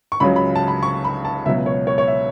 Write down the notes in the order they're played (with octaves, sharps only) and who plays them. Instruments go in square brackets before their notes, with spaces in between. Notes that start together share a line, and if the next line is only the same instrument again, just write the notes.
[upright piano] C#6
C#2 C#3 F#3 B5
B5
A5
B5
C#6
B5
A5
C#2 B2 F#3 E5
C#5
C#5
C#5
E5